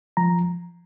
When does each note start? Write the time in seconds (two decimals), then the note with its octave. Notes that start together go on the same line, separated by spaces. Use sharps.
0.17 F3 A#5